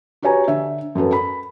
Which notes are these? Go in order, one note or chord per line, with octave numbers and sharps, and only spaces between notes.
F#4 G4 B4 C#5 G#5 A#5
D3 E5
F#2 F#3 A4 B4
B5